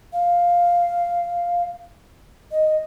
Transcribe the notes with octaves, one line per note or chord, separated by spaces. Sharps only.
F5
D#5